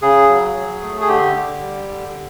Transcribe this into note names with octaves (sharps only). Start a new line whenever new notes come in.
C#3 G#4
F#3
F#3
A3
G#4
D3 G4
D3
G3
D3